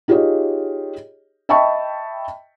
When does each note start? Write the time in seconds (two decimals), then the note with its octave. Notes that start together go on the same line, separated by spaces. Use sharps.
0.08 D#4 F4 G4 G#4 C#5 D#5
1.49 D#5 E5 G5 A5 B5 C#6